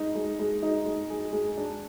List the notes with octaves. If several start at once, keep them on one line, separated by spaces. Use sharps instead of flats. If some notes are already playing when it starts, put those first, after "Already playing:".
Already playing: G#3 D#4
G#3
G#3
D#4
G#3
G#4
G#3
D4